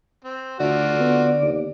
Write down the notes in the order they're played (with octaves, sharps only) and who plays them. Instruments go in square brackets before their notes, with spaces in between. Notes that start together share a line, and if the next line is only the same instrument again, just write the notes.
[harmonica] C4
[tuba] D2 [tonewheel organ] D3 D5 [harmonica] A3 F4 F#4
[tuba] B3
D#2